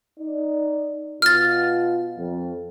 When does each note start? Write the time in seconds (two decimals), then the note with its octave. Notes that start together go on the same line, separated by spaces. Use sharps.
0.20 D#4 D5
1.22 B2 F4 F6 A6
2.18 F2